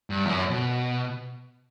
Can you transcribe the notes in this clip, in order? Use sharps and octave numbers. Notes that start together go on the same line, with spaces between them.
G2
E2
F#2
B2